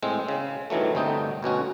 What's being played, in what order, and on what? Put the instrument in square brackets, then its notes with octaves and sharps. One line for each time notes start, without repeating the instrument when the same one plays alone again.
[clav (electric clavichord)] A2 G#3 C4
C#3
G2 D#3 E3 F#3 A3
G1 C3 A3 D#4 G5
D2 B2 C#4 F#4